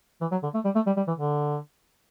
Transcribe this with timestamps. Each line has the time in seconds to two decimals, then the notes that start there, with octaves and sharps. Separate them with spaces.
0.21 E3
0.32 F#3
0.43 D3
0.54 A3
0.65 G3
0.75 A3
0.86 G3
0.97 G3
1.08 E3
1.18 D3